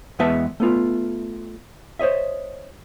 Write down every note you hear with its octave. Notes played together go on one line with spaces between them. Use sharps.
E2 G#3 B3 B4 E5 A5
A3 B3 F4
C5 C#5 D#5 E5